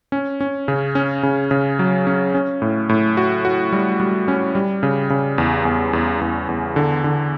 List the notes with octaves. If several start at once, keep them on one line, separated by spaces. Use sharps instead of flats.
C#4
C#4
C#3
C#4
C#3
C#3
F#3
C#4
C#4
A2
A2
F#4
F#4
G3
G3
C#4
G3
C#3
C#3
E2
E2
E2
E2
E2
D3
D3